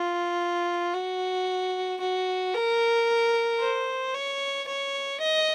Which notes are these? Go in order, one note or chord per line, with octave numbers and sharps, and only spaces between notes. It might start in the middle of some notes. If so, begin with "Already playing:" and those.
Already playing: F4
F#4
F#4
A#4
C5
C#5
C#5
D#5